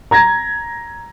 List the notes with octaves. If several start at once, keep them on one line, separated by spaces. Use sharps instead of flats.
A#5 G#6 A#6